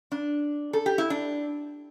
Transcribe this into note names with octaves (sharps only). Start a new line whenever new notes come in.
D4
A4
G4
E4
D4